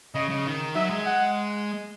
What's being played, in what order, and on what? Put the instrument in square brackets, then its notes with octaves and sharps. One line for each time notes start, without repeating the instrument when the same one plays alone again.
[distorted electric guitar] C#3 [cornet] D#5
[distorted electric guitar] C#3
D#3
[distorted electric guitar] F#3 [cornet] E5
[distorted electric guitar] G#3
[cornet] F#5